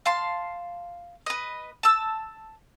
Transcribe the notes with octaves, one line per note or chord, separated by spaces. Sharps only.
F5 A5 C6
B4 D#5
A5 E6